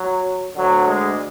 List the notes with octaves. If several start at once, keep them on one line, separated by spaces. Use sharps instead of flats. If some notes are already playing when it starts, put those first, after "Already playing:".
Already playing: F#3
D2 D3 F#3
G#3